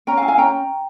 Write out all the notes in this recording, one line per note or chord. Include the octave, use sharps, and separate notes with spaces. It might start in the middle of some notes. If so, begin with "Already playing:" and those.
C#4 G5 A#5
F5 G#5
E4
F5 G#5
C#4 G5 A#5